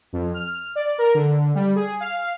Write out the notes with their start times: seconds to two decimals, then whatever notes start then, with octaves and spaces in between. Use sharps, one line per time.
0.13 F2
0.34 F6
0.76 D5
0.98 A#4
1.15 D3
1.55 G3
1.76 G#4
2.00 F5